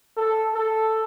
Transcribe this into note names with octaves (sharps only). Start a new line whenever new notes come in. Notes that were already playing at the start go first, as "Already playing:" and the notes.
A4
A4